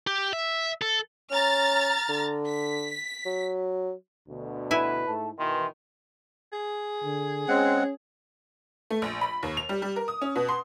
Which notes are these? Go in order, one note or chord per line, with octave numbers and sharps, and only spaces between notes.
G4
E5
A4
C#4 A#5 F6 A6
D3
B6
F#3
D2 B2 D3
E4 B4 G#5
G#2 A3 A5
B2 D#3 E3 C6
G#4
D3
G#3 C4 C#4 F#5
A3
A#1
B5
D#2
F7
G3
G3
A#4
D#6
C#4
B2
C6